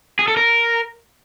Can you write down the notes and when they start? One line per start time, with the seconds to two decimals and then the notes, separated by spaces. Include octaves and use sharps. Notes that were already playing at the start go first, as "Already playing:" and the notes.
0.19 G#4
0.28 A4
0.37 A#4